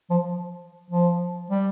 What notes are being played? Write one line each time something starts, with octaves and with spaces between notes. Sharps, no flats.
F3
F3
G3